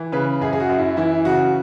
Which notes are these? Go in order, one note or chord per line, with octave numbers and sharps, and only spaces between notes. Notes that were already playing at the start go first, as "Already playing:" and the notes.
Already playing: E3
C#3 B4
F#2 G#4
G#4
F#4
F#2
E4
E3 E4
C#3 F#4